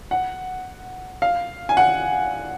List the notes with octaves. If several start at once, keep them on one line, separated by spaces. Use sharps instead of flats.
F#5
F5
G#5
F#5